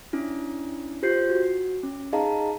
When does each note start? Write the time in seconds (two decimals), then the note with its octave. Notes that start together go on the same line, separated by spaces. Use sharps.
0.13 C#4 D4 E4
1.03 F4 G4 C5 G6 C7
1.29 F#4
1.83 C#4
2.12 D#4 G#4 D#5 F5 A5 A#5